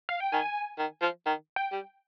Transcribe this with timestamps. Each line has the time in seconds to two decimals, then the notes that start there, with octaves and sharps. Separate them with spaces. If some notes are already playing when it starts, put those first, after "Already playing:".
0.09 F5
0.20 G5
0.32 D#3 G#5
0.78 D#3
1.01 F3
1.26 D#3
1.56 G5
1.72 G3